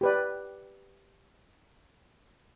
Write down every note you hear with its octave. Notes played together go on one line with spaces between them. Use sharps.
G4 B4 D5